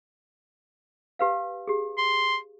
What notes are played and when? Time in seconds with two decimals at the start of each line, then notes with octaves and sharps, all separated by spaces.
1.19 G4 B4 F5
1.68 G4 G#4
1.97 C6